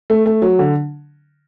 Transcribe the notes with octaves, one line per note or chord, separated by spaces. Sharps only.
A3
A3
F#3
D3